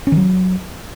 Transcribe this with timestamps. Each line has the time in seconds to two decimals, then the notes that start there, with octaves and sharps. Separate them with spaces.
0.07 C#4
0.12 D#3
0.17 F#3